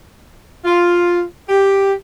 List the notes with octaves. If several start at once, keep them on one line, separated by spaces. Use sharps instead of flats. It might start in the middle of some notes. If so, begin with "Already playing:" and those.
F4
G4